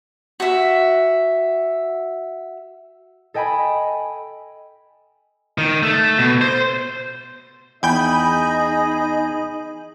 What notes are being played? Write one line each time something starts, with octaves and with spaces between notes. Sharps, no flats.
F#4 E5
A4 D#5 G5 G#5 B5
D#3
A3
B2
C5
E2 D#4 G#4 D#5 G5 G#5 B5 G6